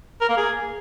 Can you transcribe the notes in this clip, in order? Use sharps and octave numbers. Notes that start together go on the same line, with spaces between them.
A#4
A#3
G#4